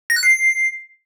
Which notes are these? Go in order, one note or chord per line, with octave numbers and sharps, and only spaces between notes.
A#6
F#6
C7